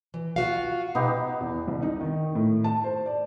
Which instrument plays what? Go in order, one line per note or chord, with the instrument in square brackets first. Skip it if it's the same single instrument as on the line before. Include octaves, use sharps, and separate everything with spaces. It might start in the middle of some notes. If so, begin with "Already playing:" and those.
[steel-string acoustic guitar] E3
F4 F#4 F5
[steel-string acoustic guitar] B2 [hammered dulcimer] B3 D#4 G4
[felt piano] E2
C2
D#4
D#3
A2
A5
C5
D5